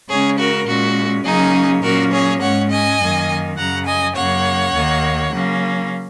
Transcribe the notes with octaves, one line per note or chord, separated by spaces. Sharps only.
C#3 G#3 C#4 G#4 C#5
F#4 A#4
A#2 G#3 C#4 F#4
C#3 F#3 A#3 C#4 D#4 G#4
A#2 F#3 A#3 C#4 F#4 A#4
G#4 C#5
G#2 G#3 C#4 C#5 F#5
D#5 G#5
F#2 D#3 A#3
F#2 C#3 F#3 F#5 A#5
D#5 G#5
F#2 C#3 A#3 C#5 F#5
D#2 D#3 A#3
C#3 F#3 A#3 C#4